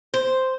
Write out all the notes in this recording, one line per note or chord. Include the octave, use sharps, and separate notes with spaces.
C5